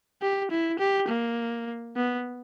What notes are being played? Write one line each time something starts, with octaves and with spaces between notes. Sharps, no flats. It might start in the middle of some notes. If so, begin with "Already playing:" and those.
G4
E4
G4
A#3
B3